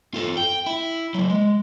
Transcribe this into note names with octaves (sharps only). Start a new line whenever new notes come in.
F4 A4
G5
E4
F#3 A#3
G#3